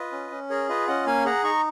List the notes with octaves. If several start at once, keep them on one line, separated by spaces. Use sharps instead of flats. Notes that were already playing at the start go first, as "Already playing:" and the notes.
Already playing: F4 B4 D#5
C#4
C#4
G#4 A#4 C#5
F4 B4 D#5
C#4 D#5 F#5
A#3 F5 G#5
G#4 F#5 A#5
D#4 A#5 C#6